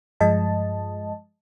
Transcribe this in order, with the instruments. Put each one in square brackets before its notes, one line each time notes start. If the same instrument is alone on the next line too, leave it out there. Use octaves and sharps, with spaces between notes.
[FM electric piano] G2 F3 G#3 D#5 A5